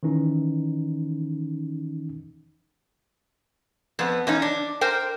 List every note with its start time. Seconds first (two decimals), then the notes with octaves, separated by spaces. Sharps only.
0.03 D#3 E3 C#4 D#4
3.99 F2 B3
4.27 E2 C#4 D#4
4.42 D4
4.81 A#4 C5 G5